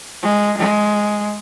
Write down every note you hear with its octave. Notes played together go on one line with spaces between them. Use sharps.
G#3
G#3